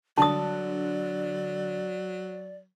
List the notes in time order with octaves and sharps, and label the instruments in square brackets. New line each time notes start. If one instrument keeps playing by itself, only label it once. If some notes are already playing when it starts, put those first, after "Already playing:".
[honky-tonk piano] D3 [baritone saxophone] F#3 [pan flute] D5 [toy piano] A5 D#6